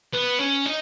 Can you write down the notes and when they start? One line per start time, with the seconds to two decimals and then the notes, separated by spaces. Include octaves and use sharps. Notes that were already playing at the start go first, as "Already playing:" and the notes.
0.13 B3
0.39 C#4
0.66 D#4